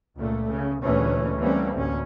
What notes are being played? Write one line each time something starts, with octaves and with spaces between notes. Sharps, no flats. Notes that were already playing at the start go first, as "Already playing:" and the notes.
C#2 A#2 A3
C#3
D2 A#2 E3 G#3 A3 C#4
E3 G3 A3 A#3 C4 C#4
A1 D2 C#4